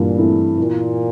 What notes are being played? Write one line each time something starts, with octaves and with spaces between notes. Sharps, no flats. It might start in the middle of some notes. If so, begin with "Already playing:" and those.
Already playing: G2 A#2 E3 E4
E3 A3 C4 E4
A#2 E3